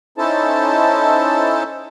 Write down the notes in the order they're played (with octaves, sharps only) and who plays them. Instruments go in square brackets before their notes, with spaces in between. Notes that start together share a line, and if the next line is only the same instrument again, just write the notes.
[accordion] C#4 D#4 E4 A4 C5 A5